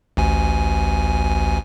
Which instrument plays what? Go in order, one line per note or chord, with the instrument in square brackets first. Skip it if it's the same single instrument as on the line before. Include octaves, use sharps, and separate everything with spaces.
[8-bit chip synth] A1 D2 G#5